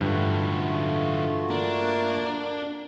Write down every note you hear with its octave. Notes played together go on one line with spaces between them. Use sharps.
G2 D3 E3 A3 F4 F#4
A#3 D4